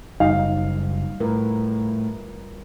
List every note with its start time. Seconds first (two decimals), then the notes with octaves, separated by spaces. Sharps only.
0.20 F#1 G3 D#4 F5
1.20 A2 F4 A#4 B4